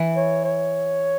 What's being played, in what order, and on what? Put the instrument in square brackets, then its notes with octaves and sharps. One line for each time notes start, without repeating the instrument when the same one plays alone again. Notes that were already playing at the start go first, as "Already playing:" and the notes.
Already playing: [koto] E3
[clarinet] C#5
C#5